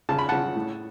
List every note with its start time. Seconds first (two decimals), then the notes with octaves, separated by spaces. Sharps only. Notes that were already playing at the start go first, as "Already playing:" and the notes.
0.09 C#3 A5
0.19 B5
0.29 C#3 F#5 A5
0.56 A2